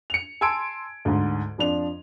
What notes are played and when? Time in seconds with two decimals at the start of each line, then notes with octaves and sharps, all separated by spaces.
0.10 C#7 F7
0.41 G#5 A5 C6 E6 G#6 D7
1.05 D2 G#2
1.58 F2 F3 D4 F7